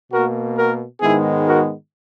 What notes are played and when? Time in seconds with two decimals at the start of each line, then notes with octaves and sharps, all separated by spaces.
0.12 B2 A#3 F#4 A#4
0.57 F#4 A#4
1.01 G#2 D#3 G#3 B3 E4 G#4
1.46 F#4 A#4